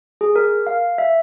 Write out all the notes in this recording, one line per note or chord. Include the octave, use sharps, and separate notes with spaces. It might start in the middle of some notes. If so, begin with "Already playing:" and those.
G#4
A#4
F5
E5